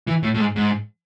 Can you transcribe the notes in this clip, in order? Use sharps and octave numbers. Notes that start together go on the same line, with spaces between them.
E3
A2
A2
G#2
G#2